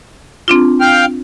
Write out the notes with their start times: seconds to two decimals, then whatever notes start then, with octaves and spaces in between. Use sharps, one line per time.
0.48 C4 D4 F4
0.81 F5 G5 F6